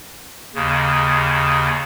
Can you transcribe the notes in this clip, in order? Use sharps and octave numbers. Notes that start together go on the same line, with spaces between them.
D#2 C#3